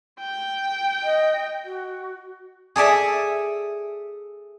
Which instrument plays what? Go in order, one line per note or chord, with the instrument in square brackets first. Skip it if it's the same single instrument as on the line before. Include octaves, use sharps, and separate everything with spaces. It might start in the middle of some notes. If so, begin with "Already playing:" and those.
[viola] G5
[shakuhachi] D#5
F#4
[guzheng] G#4 A4 D5 E5